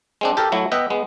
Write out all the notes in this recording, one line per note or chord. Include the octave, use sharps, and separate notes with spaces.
G#3 C4 D4
G4 A4 A#4
F#3 A3 E4
B3 B4 D#5 E5 G5
G#3 B3